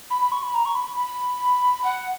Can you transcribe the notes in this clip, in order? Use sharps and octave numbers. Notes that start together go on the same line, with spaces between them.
B5
B5
C#6
B5
A#5
C#6
B5
B5
F#5